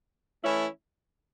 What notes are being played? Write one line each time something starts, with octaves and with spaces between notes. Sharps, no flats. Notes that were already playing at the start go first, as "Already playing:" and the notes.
E3 A3 C#4 E4